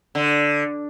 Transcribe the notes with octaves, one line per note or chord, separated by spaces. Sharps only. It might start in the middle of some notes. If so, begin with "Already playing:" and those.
D3